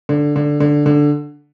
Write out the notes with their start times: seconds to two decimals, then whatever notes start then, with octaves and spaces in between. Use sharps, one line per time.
0.09 D3
0.36 D3
0.60 D3
0.86 D3